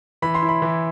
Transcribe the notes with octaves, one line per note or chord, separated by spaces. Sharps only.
E3 B5
C6
E4
B5
E3